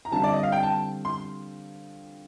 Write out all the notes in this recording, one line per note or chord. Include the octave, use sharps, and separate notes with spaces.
A#5
D3 G3 C4 F4 A5
D5
D#5
F5
G5
A5
C6